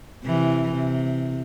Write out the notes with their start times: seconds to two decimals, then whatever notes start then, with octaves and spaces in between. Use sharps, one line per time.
0.24 C3 E3
0.72 C3